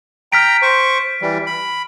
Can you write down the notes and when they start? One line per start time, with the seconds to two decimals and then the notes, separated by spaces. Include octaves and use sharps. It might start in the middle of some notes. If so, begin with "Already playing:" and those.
0.32 G5 A#5 F6 B6 D7
0.62 C5 C#6
1.22 E3 G3
1.47 B5